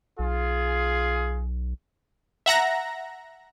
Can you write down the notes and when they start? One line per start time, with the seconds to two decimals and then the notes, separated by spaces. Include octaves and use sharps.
0.19 B1 F4 G#4
2.46 E5 F#5 A#5 A#6